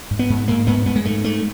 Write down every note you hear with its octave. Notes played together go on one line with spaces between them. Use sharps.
G#2
B3
G#2
G#2 A#3
G#2 B3
G#2 B3
G#3
G#2 A3
G#2 A3